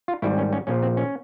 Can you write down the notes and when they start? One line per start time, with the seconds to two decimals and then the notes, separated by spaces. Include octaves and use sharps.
0.08 F4
0.22 G#1 G#2 G3 E4
0.37 C#4
0.53 C#4
0.67 A#1 A#2 F3 C#4
0.83 C4
0.97 C#4